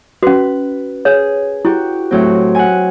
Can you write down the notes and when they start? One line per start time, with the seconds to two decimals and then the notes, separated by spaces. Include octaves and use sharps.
0.23 C#4 F#4 B4
1.05 G#4 C#5
1.65 E4 F#4 G4
2.11 A2 F#3 C4
2.55 F#5 G#5